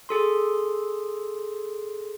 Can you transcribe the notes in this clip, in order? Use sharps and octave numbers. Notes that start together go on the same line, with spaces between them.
G#4 A4 C6